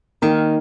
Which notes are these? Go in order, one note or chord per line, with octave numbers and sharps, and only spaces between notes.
D#3 A#3